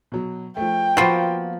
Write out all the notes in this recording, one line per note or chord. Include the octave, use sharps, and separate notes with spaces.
B2 F#3
F3 A3 G5
F3 A#3 B3 F4 F#4 B5